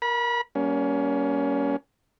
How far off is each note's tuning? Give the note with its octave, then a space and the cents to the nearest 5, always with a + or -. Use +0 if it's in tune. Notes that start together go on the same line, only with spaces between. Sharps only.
A#4 +10 B5 -30
G3 -15 A#3 +20 C#4 +20